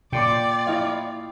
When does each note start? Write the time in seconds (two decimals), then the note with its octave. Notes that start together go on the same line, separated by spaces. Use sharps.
0.12 A#2 D5 G5 C6 D6
0.67 E4 D#5 F5